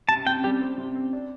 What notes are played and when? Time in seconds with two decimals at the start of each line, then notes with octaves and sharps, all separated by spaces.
0.09 C3 A5
0.26 C3 G5
0.44 G3 G4
0.61 C4
0.78 C3
0.95 C4
1.13 D4